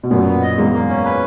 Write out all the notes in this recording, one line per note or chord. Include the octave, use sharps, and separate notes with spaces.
B2
F#2 A#2 B3
B3
D#5
E2 G#2 A#3
A#3
C#4
B4